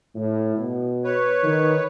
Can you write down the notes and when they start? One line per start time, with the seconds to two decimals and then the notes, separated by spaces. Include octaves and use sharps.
0.15 A2
0.56 B2
1.04 B4 C#5
1.43 D#3